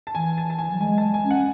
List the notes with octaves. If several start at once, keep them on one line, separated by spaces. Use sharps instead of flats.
A5
E3 G#5
A5
A5
G#5
F#3
G#3 G#5
A5
G#5
C#4
F#5